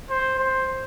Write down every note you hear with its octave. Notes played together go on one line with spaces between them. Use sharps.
C5
C5